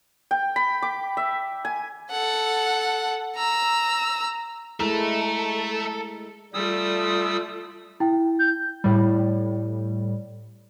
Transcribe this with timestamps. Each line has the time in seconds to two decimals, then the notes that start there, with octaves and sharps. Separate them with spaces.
0.31 G5
0.56 B5
0.82 D6
1.17 E5
1.65 G#5
2.11 A4 F#5
3.36 A#5 E6
4.80 G#3 A3 E4 A4 A#4 E5 A5
6.54 G3 A3 F4 D#6 E6
8.00 E4 G5
8.39 G6
8.84 A2 G3